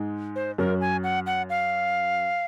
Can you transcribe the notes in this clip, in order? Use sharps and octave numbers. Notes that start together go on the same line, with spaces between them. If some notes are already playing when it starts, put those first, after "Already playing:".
Already playing: G#2 G#3
C5
F#2 F#3 A#4
G#5
F#5
F#5
F5